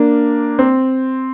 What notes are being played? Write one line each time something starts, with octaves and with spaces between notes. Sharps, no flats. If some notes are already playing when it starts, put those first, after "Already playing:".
Already playing: A#3 D4
C4